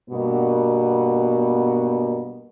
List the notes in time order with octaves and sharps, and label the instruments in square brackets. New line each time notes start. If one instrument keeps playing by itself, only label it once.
[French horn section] G2 B2 A#3 B3